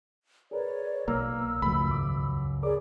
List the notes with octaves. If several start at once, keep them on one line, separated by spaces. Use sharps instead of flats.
G#4 A#4 B4 C#5 D5
B1 A#3 A#5 E6 F6
C#2 F#2 F3 A3 B5
D#2 G#2 D6
G#4 A#4 C#5 D5 D6